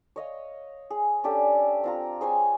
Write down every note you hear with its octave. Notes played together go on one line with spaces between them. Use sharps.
C#5 D#5 F5
G#4
C#4 D4 G4 A4
C4 F4 A#5
G#4 C5 C#5 G#5